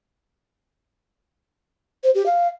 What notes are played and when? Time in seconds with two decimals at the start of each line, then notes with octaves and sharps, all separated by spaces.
2.04 C5
2.15 G4
2.26 F5